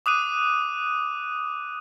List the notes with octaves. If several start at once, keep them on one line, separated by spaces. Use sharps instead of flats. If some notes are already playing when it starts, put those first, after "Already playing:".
D6 D#6 F#6 D#7